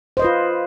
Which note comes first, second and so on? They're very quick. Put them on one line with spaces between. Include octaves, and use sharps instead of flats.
C5 D#5 B4 F4